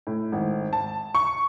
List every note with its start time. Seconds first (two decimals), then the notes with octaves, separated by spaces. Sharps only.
0.07 A2
0.32 G#1
0.73 A5
1.15 C#6